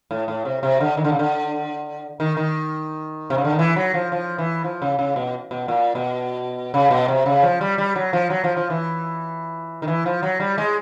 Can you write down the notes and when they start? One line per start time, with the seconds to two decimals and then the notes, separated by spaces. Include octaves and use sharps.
0.11 A2
0.28 A2
0.45 C3
0.63 C3
0.80 D3
0.97 D#3
1.04 D3
1.12 C#3
1.19 D3
2.20 D#3
2.37 D#3
3.30 C3
3.38 C#3
3.44 D3
3.52 D#3
3.59 E3
3.76 F#3
3.94 F3
4.12 F3
4.38 E3
4.64 F3
4.82 C#3
4.99 C#3
5.16 B2
5.51 B2
5.68 A#2
5.95 B2
6.74 C#3
6.91 B2
7.08 C3
7.26 C#3
7.43 F3
7.61 G3
7.78 G3
7.96 F#3
8.13 F3
8.30 F#3
8.44 F3
8.57 F3
8.70 E3
9.82 D#3
9.88 E3
10.06 F3
10.23 F#3
10.40 G3
10.58 G#3